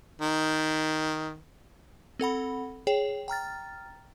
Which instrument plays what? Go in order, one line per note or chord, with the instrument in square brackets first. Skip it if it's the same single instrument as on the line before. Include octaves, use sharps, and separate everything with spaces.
[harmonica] D#3
[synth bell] C4 A4 F#5 B5
G#4 C#5 G5
G5 A#5 F6 A6